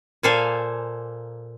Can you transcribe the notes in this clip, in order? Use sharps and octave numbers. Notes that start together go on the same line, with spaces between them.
A#2 A#3 A4 C5 F5 G#5